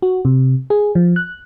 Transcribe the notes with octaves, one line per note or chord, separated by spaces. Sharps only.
F#4
C3
G#4
F3
F#6